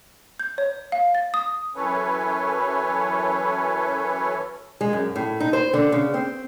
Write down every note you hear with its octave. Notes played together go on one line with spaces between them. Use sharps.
G6
C#5
F5
A6
D#6
F#2 E3 C#4 A4 B4 C#5
G#3
F#2
A2
D#4
C5
D3
C#3
C4